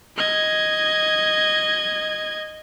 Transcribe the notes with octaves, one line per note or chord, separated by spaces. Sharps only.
D#5 G#6